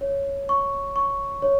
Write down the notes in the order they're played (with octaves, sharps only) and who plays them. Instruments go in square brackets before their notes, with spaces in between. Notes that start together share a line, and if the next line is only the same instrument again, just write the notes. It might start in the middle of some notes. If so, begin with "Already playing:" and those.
[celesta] C#5
C#6
C#6
C#5